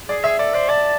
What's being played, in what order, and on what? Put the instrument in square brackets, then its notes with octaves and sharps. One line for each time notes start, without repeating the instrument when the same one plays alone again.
[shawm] G#4 [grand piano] D5
[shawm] G#4 [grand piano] E5
[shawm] A4 [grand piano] D5
[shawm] C5 [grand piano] D5
[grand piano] D5 [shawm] A5